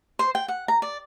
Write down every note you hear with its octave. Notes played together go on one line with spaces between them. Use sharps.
C5
G5
F#5
A#5
D5